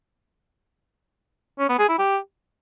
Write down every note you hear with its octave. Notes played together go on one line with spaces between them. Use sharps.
C#4
B3
G#4
E4
G4